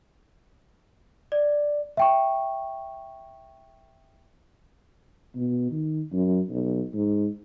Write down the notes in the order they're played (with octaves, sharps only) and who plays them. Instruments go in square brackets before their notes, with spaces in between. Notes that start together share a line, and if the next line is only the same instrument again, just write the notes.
[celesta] D5
E5 G5 C#6
[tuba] B2
D#3
F#2
B1
G#2